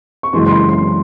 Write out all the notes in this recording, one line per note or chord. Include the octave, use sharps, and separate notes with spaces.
C#6
F#1 F#2 C#3 E3 G#3 C6
C6
B5
C6